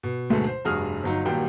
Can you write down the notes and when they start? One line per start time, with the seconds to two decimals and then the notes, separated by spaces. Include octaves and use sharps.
0.03 B2
0.30 D2 G#2 B2 F#3 G#3 A3
0.47 C5
0.65 F1 G2 F#4 G#4 D#6 F6
1.03 G1 F#3 D#4
1.25 D#1 D#2 F#3 G3 G5